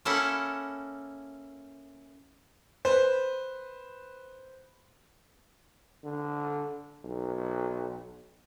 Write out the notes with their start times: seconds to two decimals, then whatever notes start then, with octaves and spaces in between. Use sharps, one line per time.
0.05 A#3 C#4 E4 A4 F#5 A5
2.85 B4 C5
6.04 D3
7.04 B1